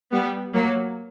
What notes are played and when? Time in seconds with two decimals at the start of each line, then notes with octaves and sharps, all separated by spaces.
0.11 G3 B3
0.54 F#3 A#3